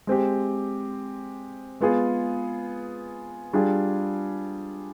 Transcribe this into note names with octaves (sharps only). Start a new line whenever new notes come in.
G#3 C4 G4
G#3 B3 F4 G#4
G3 D4 F4 G#4